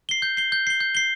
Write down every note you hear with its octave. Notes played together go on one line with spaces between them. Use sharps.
C7 G7
G6
C7 G7
G6
C7 G7
G6
C7 G7